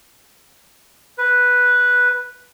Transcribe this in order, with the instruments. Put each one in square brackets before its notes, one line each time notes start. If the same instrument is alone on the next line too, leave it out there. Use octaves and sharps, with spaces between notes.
[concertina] B4